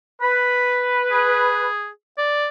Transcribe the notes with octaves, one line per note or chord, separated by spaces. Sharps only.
B4 B5
G#4
D5